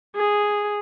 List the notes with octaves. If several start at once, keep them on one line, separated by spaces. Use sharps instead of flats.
G#4